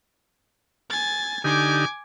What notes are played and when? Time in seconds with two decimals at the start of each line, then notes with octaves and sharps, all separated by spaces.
0.90 G#5 A6
1.44 D3 D#4 G4 G#5 D6